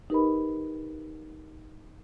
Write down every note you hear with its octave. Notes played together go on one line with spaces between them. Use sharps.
D#4 G4 A#4 B4 D#5 B5